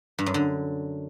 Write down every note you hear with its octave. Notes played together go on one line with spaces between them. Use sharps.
G2
F#2
D3